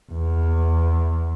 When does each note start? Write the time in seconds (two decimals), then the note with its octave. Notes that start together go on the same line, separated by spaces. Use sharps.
0.12 E2